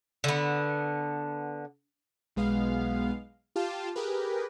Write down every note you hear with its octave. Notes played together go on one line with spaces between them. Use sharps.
D3 B3
B1 G#3 B3 F5
F4 G4 F5 A5
G4 G#4 A#4 B4